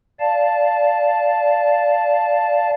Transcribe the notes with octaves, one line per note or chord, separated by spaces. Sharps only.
D5 F5 A5